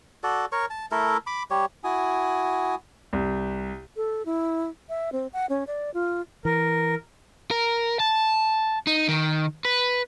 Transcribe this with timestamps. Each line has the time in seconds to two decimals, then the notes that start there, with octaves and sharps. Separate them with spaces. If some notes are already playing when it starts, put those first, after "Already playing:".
0.24 F#4 A4 D5
0.52 A#4 C#5 C#6
0.70 A5
0.91 A3 E4 A4 A#4
1.27 B5 D6
1.51 G3 G4 C#5
1.84 E4 F#4 G#5 D#6
3.13 C2
3.96 A4
4.26 E4
4.89 E5
5.12 C4
5.33 F#5
5.49 C#4
5.67 D5
5.94 F4
6.45 E3 A#4
7.51 A#4
8.00 A5
8.87 D#4
9.08 D#3
9.65 B4